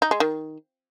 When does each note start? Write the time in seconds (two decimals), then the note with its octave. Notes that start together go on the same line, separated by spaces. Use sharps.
0.02 D#4
0.11 G#3
0.20 D#3